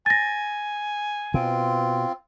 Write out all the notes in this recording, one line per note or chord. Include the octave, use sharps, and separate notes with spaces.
G#5 A6 A#6
B2 C4 F4